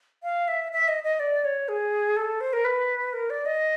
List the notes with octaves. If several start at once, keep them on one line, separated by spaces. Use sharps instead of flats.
F5
E5
E5
D#5
D#5
D5
C#5
G#4
A4
C5
A#4
B4
A#4
D5
D#5